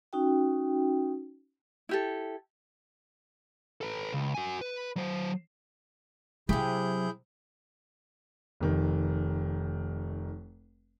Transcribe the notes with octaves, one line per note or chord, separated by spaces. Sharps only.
C#4 D#4 F#4 G5
E4 G4 A4
A4 B4
C#2
F#4 G#5
B4
F#3 C5
C3 F#3 E4 G4 G#4 G6
F1 D#3